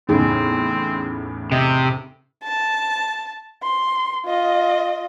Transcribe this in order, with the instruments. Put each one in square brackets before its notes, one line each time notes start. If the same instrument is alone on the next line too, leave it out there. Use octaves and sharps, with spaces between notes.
[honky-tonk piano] E2 A2 C#3 [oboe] C4 [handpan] D#4 G#4
[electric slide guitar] C3 [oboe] D#5
[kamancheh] A5
C6
F4 D#5